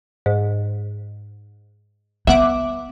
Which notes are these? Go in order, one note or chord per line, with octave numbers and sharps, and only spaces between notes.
G#2
B3 E5 F#5 D6